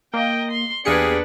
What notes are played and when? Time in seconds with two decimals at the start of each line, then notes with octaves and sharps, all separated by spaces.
0.14 A#3 D#5 G5
0.51 C6
0.85 E2 A#3 D4 G4 G#4 B4 C#7